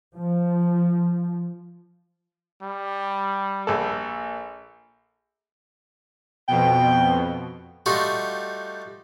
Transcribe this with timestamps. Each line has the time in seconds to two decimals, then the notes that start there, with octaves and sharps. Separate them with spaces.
0.15 F3
2.62 G3
3.67 A#1 A4
6.48 F2 B2 G5
7.86 G3 A3 D#4 F4 F#4